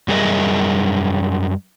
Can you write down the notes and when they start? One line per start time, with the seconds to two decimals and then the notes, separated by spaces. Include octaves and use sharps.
0.08 F#2 G3 G#4 A#4 D#5 E5